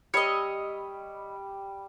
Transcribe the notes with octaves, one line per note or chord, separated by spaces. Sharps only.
G3 C#5 D#5 B5 E6